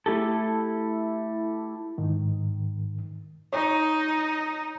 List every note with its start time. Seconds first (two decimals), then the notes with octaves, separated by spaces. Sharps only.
0.06 A3 E4 G4 A4
1.98 G#2 D#3
3.53 D#4 C#5